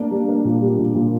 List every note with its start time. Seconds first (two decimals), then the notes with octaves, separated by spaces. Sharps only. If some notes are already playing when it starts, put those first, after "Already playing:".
Already playing: A#3 D4
0.11 G3
0.28 A#3
0.45 A#2
0.61 G3
0.79 A#2
0.95 A#2